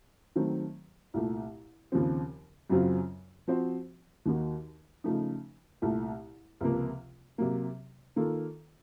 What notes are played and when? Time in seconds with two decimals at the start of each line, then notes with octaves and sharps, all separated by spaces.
0.36 D#3 F#3 A3 C4
1.14 C2 A#2 A3
1.92 D#2 C#3 F3 C4
2.70 F#2 C#3 F#3 C4 F4
3.48 F3 C4 F#4 C5
4.26 D#2 D#3 A#3 D#4 F#4
5.04 C#3 F3 A3 D#4
5.82 C2 A#2 A3
6.60 C#2 C3 F3 A#3
7.38 C3 F#3 A#3
8.16 D#3 A#3 F4 A4